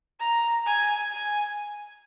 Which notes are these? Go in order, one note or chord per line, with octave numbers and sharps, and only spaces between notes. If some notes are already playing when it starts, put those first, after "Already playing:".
A#5
G#5
G#5